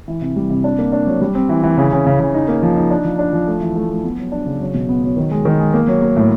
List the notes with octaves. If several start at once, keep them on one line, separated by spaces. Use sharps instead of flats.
E3
C3
G3
C3
D4
A#3
D4
F#3
G3
C4
E3
E3
C#3
C#3
C#3
C#3
D#4
A#3
F3
D#4
D4
F3
D4
F3
A3
E3
A3
A3
B3
F#3
D4
C#3
F#3
B2
B3
F#3
D#3
G#3
D#3
G#3
A#3
F#3
A#3
A2